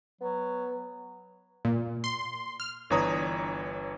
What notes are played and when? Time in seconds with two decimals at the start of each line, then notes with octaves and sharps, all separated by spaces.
0.21 F#3 B3
1.65 A#2
2.04 C6
2.60 F6
2.90 G1 E3 D4 C#5 A#5 D#6